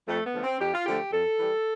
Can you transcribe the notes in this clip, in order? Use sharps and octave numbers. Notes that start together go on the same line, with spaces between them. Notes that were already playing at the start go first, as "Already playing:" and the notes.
F2 A3
B3
D3 F3 A3
C4
F2 G4
F4
D3 F3 A3 G4
F2 A4
E3 G3